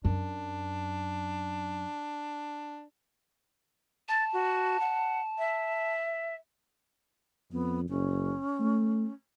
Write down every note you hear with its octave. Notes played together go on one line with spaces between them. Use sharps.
F#2 D4
A5 A6
F#4
F#5
E5
F2 B3
F#1 C#4
A3